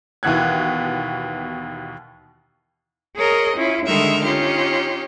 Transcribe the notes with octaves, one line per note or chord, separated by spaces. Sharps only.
D#2 B2 E3 B3 F#6 G#6
G#4 A#4 C#5 D#5
C#4 E4 F4
D3 D#3 G3 G#3 E5 F6
C#4 D#4 F4 G4